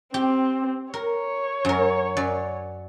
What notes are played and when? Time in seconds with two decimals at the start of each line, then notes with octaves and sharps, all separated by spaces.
0.14 C4 G4
0.94 A#4 C#5
1.65 F#2 A#4
2.17 F#2 D5